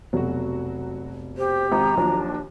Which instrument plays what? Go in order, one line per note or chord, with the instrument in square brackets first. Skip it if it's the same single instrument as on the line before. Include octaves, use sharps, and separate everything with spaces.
[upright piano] F1 B2 [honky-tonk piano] F#3 F#4
[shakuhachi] G4 [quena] C5
[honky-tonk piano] G#1 [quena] A#5
[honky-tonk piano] D#2 F3 F#3 [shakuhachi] D4